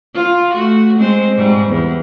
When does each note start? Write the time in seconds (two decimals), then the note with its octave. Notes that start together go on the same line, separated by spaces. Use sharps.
0.15 F4
0.53 A3 F#4
0.96 G#3 C4 C5
1.37 G#2 G3
1.69 E2